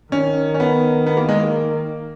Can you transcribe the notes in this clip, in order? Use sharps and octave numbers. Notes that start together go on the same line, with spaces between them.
D#3 C#4
C#4
B3
B3
A#3
G#3
A#3